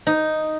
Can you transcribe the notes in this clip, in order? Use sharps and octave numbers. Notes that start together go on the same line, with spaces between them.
D#4